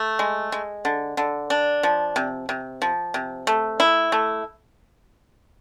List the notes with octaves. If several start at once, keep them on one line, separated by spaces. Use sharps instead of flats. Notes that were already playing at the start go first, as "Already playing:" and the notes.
Already playing: A3
G#3
G#3
D3
D3
D4
F3
C3
C3
F3
C3
A3
E4
A3